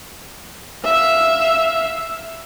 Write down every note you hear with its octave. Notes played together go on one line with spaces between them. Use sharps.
E5 F5